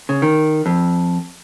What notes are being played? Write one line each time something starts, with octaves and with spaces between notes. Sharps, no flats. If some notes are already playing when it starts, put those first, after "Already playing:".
C#3
D#3
F2